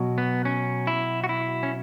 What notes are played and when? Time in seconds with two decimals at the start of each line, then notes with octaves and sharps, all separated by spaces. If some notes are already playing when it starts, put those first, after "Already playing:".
Already playing: B2 F#3
0.18 B3
0.45 C#4
0.87 E4
1.24 F#4
1.29 E4
1.63 C#4